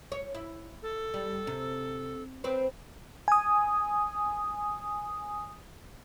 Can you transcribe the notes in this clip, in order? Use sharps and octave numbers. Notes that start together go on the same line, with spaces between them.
C#5
E4
A4
G3
C3
C4 B4 C5
G#5 D#6